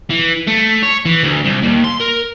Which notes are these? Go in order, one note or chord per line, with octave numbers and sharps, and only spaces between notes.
E3
A3
C#5
E3
D2
C2
D#2
C6
A#4